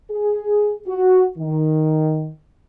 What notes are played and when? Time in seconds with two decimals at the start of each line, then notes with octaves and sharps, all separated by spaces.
0.10 G#4
0.88 F#4
1.38 D#3